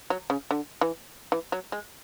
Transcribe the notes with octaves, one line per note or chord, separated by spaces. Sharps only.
F#3
C#3
D3
E3
E3
F#3
G#3